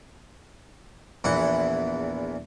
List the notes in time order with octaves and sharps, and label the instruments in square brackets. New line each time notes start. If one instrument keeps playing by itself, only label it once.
[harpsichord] A#1 E2 E3 F#5